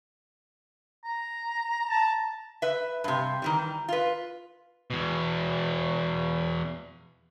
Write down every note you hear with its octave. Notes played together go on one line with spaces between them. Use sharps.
A#5
A5
B4 E5
G2 C3
D#3 E3 G3
F4 B4
E2 B2